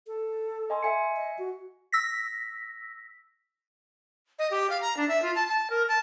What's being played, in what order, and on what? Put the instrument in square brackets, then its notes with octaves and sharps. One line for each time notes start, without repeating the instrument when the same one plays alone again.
[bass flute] A4
[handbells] D#5 G#5 C6
E5 G#5 C#7
[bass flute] D#5
F#4
[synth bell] E6 A#6 B6
[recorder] D#5
G4
F5
A#5
D4
E5
F4
A5
A5
A#4
A5